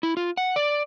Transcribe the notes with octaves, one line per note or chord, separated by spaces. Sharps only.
E4
F4
F#5
D5